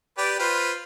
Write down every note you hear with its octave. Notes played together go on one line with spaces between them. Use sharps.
G4 B4 D5
F4 B4 C5